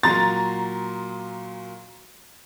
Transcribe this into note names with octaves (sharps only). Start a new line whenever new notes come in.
A#2 F#3 A#5 C6 A6